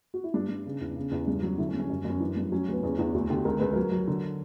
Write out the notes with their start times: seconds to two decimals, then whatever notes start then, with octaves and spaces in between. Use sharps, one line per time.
0.14 F#4
0.24 E4
0.34 G2 D4
0.49 G2
0.66 C#3
0.81 E2
0.96 C#3
1.11 E2
1.27 G2
1.43 F#3
1.58 D3 E4
1.69 C#4
1.74 G2
1.80 C#4
1.90 F#2
2.05 F#2 C#4
2.20 E3 D4
2.37 G2
2.52 F#3 C#4
2.68 D2 B3
2.83 E2 C#4
2.99 E2 D4
3.14 D2 F#4
3.30 D3 G4
3.45 C#2 A#4
3.59 C#2 B4
3.73 F#3 A#4
3.91 F#3
4.07 D3